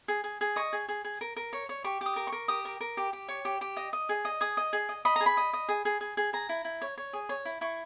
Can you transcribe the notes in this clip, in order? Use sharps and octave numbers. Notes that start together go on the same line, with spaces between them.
G#4
G#4
G#4
D#5 C#6
G#4
G#4
G#4
A#4
A#4
C#5
C#5
G4 C#6
G4 D#6
A#4
C#6
A#4
G4 D#6
A#4
A#4
G4
G4
C#5
G4
G4
D#5
D#5
G#4
D#5
G#4 D#6
D#5
G#4
D#5
D#5 B5
G#4 A#5
B5
D#5
D#5
G#4
G#4
G#4
G#4
G#4 A#5
E4
E4
C#5
C#5
G#4
C#5
E4
E4 C#6